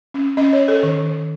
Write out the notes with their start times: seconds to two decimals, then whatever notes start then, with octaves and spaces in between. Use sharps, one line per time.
0.14 C#4
0.37 C#4 D#5
0.53 C#5
0.60 C#4
0.68 A4
0.83 D#3
1.07 D#3